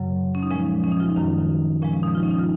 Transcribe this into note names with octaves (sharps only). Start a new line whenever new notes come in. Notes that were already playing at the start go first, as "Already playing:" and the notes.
Already playing: F#2 C#3 F#3
C#4
D#4
A#2 F3 G#3 C#4
C#4
D#4
F4
D#4
F#2 D#3 G#3 C#4
A#2 F3 G#3 C#4
C#4
D#4
F4
C#4
D#4
F4